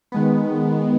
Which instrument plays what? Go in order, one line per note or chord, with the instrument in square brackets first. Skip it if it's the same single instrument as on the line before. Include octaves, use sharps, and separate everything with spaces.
[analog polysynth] D#3 G#3 B3